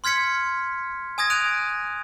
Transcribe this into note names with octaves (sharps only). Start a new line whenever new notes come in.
C6 F6 G#6 B6 C#7
G#5 D#6 G#6 A#6
F#6 D7 D#7 F7